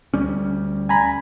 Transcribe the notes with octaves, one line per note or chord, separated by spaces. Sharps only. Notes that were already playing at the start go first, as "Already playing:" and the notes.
D2 G3 C#4
G#5 A#5 B5